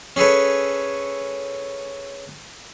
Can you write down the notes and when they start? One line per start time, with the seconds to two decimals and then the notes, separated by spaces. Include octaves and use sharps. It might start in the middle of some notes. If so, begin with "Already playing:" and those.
0.16 C#4 G#4 A4 B4 C#5